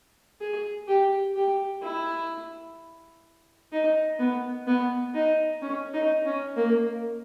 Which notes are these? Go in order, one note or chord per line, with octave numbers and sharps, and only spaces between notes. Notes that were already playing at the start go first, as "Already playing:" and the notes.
G#4
G4
G4
E4
D#4
B3
B3
D#4
C#4
D#4
C#4
A#3